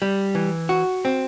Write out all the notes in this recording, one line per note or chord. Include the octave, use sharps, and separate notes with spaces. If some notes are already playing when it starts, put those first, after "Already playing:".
G3
E3
F#4
C4